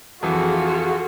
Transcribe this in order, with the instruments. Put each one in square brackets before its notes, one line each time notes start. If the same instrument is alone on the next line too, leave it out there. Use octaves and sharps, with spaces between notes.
[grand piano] F2 E3 [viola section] F4 G#4 A4 [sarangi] F#4